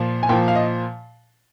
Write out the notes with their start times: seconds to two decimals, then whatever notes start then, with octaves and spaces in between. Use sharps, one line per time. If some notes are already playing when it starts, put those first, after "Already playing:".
Already playing: A#2 F3
0.23 G#5
0.29 A#2 F3 G5
0.48 F5
0.55 D#5